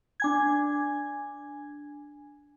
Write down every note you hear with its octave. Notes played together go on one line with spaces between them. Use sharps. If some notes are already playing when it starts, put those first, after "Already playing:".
D4 G#5 G#6